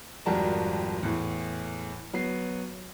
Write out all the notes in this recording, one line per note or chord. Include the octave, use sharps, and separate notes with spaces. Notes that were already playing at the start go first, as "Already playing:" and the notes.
G#1 F2 G3 F#4 A#4 A5
E2 A2
F#3 B3 C7